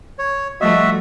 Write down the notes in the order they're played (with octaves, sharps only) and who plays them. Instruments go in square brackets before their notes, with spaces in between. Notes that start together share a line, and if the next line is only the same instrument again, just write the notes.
[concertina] C#5
[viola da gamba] F3 G3 A3 [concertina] F#4 E5 [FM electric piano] A4 D#5